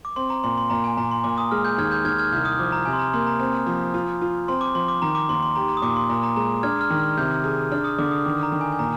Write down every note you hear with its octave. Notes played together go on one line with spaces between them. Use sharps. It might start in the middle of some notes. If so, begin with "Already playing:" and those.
D6
C4 C6
A#5
A#2 C6
C6
A#2 A#5
G#5
A#2 A#5
C6
A#2 D6
D#6
G#3 F6
G6
D#2 F6 G#6
G6
D#2 F6 G#6
F6 G#6
C2 G6
D#6
F3 D6
A#5
C3 G#5
C6
A#5
A#3 C6
A#5
C4
F3
F4
F4
C4 C6
D6
F3 C6
D6
D#3 A#5
D6
D#2 C6
C6
G4 A#5
A#5
D#6
A#2 D6
C6
A#2 A#5
A#5
G#3 A#5
D4 F6 G#6
F6
D#3
F6
C3 G6
G#4
D4 F6
D#6
D3 D6
D#6
D#3 D6
A#5
D#3
G#5
G#5
A#2 A#5